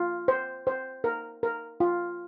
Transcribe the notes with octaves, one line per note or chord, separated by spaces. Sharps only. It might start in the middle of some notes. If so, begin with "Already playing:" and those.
Already playing: F4
C5
C5
A#4
A#4
F4